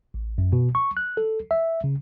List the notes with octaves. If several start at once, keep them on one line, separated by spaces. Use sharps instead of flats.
A1
F#2
B2
C#6
F#6
A4
E5
C#3